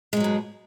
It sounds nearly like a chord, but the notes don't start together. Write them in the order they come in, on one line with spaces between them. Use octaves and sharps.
G#3 G#2 F#3 B2